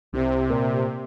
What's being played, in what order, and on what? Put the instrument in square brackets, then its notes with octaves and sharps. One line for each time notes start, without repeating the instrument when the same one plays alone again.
[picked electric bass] C2 [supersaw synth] C3
[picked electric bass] A#2